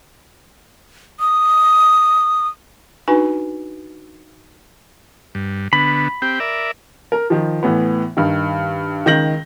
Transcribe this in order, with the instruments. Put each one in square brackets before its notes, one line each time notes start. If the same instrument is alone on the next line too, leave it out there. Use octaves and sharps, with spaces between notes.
[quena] D#6
[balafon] D4 D#4 F#4 B4 G#5
[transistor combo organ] G2
[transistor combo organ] D3 B3 [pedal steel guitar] B5
[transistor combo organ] C4 G4 G5
A#4 D5 E5
[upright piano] A#4
D#3 F3
A2 E3 B3
G2 D#3
C#2 D#3 G6 A#6 F#7